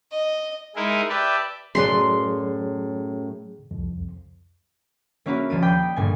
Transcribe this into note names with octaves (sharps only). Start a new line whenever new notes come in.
D#5
G#3 D#4 E4 G#4 A#4
G4 B4 D5 E5 A5
F#2 A2 F#3 G#4 B4 D5 C6
C2 F2
A#3 C#4 E4 F#4 B4
D#1 F3 A#3 D#7
G5 B5 D6 D#6 G6 C7
G1 A#2 G#5